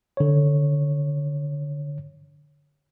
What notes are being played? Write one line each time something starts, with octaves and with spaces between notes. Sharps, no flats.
D3 C#5